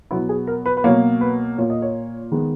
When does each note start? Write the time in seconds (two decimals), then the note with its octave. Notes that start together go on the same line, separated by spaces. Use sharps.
0.11 B2 F#3 B3 E4
0.29 G#4
0.47 A#4
0.66 B4
0.77 B4
0.84 B2 F#3 A#3 C#5
1.21 B4
1.58 A#2 A#3 C#5
1.70 D#5
1.82 C#5
2.32 D#3 G#3 B3